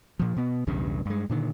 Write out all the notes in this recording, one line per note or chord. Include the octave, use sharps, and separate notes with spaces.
A#2 F3
B2 B3
B1 E2 G2 C#3
G2 G#3
A#2 D3 D#3